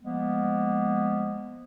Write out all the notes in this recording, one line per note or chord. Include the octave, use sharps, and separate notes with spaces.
F3 G#3 A#3 B3